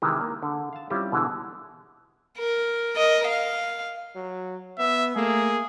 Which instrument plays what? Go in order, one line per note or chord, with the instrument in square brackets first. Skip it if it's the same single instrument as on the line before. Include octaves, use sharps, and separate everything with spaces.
[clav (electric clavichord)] C3 D#3 E3 G#3
A#3
D3
F5 A5
G3 C4 C#4 E4 F4 G4
B2 D3 E3 G#3
[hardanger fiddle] A#4
A#4 D#5
F5
[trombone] F#3
[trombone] B3 [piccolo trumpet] E5
[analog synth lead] A3 [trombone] A#3 [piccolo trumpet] G#4